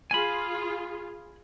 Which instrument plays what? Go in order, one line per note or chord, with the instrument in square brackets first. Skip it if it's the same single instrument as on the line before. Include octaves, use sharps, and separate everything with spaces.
[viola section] F4 G#4 [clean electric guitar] G#5 B5